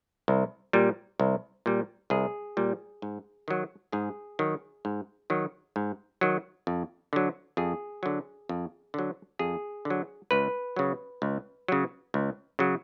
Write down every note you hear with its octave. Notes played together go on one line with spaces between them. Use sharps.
C2
A#2 G3
C2
A#2 G3
C2 G#4
A#2 G3
G#2
D#3 F#3
G#2 G#4
D#3 F#3
G#2
D#3 F#3
G#2
D#3 F#3
F2
D3 F#3
F2 G#4
D3 F#3
F2
D3 F#3
F2 G#4
D3
F#3
C#2 B4
C#3 F#3
C#2
C#3 F#3
C#2
C#3 F#3